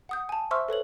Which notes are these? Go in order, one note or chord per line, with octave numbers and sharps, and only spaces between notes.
F#5 D#6 G6
G#5 A5
C5 E5 C6 C#6 E6 F6
A4 B4 C#5 F#7